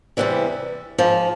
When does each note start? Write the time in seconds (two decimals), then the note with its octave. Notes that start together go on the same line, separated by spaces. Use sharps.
0.17 E2 C3 E3 G3
0.98 G#2 F3